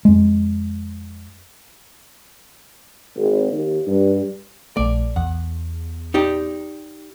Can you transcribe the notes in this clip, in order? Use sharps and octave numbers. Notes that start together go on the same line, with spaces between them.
F2 G#3
G#1
D#2
G2
A#1 A3 D5
E2 F#5
D#4 G4 D5